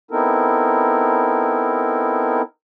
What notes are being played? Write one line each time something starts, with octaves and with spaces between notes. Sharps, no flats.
B3 C4 D#4 E4 A4 A#4